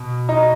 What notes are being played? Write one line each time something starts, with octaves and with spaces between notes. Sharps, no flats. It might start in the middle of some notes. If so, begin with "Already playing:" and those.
Already playing: B2
D#4